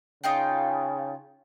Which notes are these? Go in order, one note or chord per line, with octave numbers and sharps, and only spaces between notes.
C#3 D#4 F4 G5